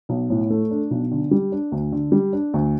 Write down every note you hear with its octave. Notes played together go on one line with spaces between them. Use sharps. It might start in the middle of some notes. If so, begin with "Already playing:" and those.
B1
A2
A3
D4
B1
D3
G3
D4
D2
D3
G3
D4
D2